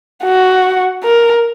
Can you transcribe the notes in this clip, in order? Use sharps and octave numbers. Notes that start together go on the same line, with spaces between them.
F#4
A#4